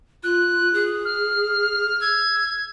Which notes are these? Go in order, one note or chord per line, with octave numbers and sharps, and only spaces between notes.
F4 F#6
G#4
F6
E6 G#6